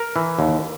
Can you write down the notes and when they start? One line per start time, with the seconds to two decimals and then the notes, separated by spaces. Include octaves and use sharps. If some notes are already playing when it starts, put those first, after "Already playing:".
Already playing: A#4
0.16 E3
0.39 D#2